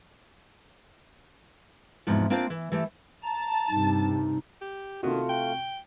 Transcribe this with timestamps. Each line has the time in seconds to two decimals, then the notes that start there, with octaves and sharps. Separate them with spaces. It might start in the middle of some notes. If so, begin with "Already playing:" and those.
2.07 E2 G#2 C3 F3
2.30 A#3 C4 D4 F4 C5 F5
2.50 E3
2.72 E3 A3 G4
3.23 A5 A#5
3.70 G2 C3 D#4
4.62 G4
5.03 C3 D#3 A3 F4 F#4
5.29 G5